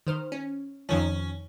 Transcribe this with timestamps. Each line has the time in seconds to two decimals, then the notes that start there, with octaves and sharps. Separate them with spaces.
0.07 D#3 C5 F6
0.32 C#4
0.89 F2 D#3 F3 C#4